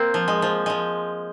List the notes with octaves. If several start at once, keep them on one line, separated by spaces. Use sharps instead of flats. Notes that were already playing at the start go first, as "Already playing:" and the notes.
Already playing: A#3 C4
F3
G#3
F3
F3 G#3